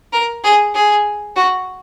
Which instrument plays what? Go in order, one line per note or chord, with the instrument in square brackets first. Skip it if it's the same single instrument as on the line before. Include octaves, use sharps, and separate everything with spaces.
[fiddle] A#4
G#4
G#4
F#4